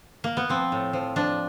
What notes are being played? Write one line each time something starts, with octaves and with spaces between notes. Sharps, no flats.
A#3
B3
F3 C4
A2
F3
F3 D4